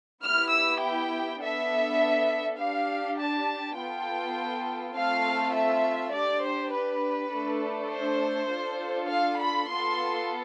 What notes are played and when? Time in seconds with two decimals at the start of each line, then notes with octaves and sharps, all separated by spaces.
0.22 B3 E4 G4 F6
0.51 E6
0.82 G5
1.40 B3 D4 A4 E5
2.58 D4 G4 F5
3.19 A5
3.77 B3 F4 A4 G5
4.95 A3 C4 F4 A4 F5
5.55 E5
6.14 D4 G4 D5
6.43 C5
6.73 B4
7.32 A3 D4 A4
7.91 C5
8.51 D4 F4 A4
9.09 F5
9.40 B5
9.69 B3 F4 A4 C6